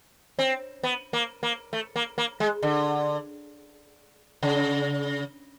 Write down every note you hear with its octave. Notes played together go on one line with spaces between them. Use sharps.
C4
B3
A#3
A#3
A3
A#3
A#3
G#3
D3
C#3